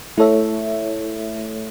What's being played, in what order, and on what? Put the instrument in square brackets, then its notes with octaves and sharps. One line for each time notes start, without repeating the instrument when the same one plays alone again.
[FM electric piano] A3 E4 A4 C#5 E5